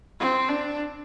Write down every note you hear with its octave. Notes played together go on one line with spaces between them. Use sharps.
C4
D4